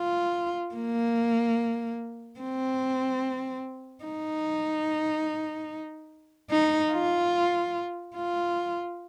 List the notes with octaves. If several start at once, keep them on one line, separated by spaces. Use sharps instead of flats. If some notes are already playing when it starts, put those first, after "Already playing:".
Already playing: F4
A#3
C4
D#4
D#4
F4
F4